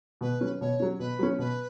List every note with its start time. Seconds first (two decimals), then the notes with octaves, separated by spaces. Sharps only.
0.21 B2 B4
0.41 F#3 C#4
0.61 B2 C#5
0.80 F#3 C#4
0.99 B2 B4
1.19 F#3 C#4
1.39 B2 B4